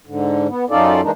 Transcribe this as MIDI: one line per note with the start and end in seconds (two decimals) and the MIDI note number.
0.07 0.47 44
0.07 0.47 50
0.48 0.65 59
0.70 1.01 42
0.70 1.01 61
0.70 1.01 63
0.70 1.01 65
0.70 1.01 69
0.70 1.01 74
1.02 1.11 52
1.02 1.11 56
1.02 1.11 58
1.02 1.11 62
1.02 1.11 63